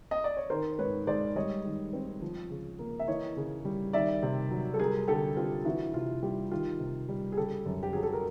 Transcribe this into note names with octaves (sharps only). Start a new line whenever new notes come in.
D#5
D5
C#5
D#3 A#4 C5
G#2 B4 C#5
G#3 C5 D5
G3 C#5 D#5
D#3
C4
F3
C#3
A#3
E5
E3 C#5 D#5
C#3
G3
D#3 D5 E5
C3
F#3
A4
G3 G#4 A#4
D3 G4 A4
C4 F4 G4
E3 E4 F#4
C3 F4
G3 F4 G4
D#3 F4 G4
C3
G3
G#4
C#3 G4 A4
F#2
G4
F#3 G#4
A4
A#4